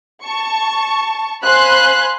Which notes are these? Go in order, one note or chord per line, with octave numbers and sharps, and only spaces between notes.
A5 C#6
C5 F5 G#5 B5 C6 F#6